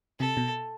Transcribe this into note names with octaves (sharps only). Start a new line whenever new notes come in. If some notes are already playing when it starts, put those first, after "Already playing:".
C3 A4
B2